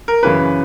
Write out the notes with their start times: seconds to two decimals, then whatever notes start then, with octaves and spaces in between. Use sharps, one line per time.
0.08 A#4
0.23 F#2 C#3 E3 B4